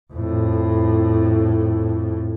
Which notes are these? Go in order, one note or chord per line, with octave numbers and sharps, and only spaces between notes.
F2 A2